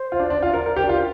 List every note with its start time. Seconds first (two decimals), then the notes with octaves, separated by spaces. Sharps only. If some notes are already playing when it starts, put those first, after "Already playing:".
Already playing: C5
0.12 F4
0.20 D4
0.30 D4
0.43 F4
0.48 C5
0.54 A#4 D5
0.66 A#4 C5
0.76 G4 C5
0.83 D4
0.89 F4 A#4